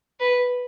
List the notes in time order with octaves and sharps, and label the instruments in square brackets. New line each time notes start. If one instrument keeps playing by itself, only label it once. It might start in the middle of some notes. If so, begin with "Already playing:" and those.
[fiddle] B4